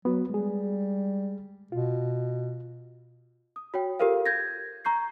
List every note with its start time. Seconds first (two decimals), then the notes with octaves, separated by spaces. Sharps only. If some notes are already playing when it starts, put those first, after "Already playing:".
0.05 F#3 B3 F#4
0.30 G3 G#3 G#4
1.72 B2 F4
3.56 D#6
3.74 F#4 C#5 G5
3.99 F4 G4 A4 A#4 C5 F5
4.26 G6 G#6 A#6
4.85 A#5 C#6 G6 C7